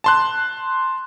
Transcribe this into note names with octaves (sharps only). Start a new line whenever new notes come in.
A5 C6 F#6